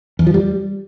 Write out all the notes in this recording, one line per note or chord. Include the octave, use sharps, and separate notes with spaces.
E2
F3
G3